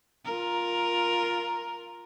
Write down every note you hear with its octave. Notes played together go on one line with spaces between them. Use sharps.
F4 A#4